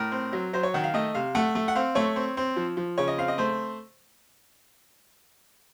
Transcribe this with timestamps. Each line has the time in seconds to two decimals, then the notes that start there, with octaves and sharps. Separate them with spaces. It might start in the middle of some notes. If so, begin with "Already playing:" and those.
Already playing: A2 A#4
0.12 C4
0.33 F#3
0.53 F#3 C5
0.63 C#5
0.74 D#3 F#5
0.84 F5
0.94 A3 D#5
1.14 C3 F5
1.35 A3 F#5
1.55 A3
1.68 F#5
1.75 C4 F5
1.95 A3 C#5
2.16 C4
2.37 C4
2.56 F3
2.77 F3
2.98 C#3 C#5
3.08 D#5
3.18 C4 F5
3.28 D#5
3.38 A3 C5